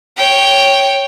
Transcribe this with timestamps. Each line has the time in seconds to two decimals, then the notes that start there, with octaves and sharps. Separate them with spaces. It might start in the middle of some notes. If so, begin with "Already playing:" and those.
0.17 C#5 G5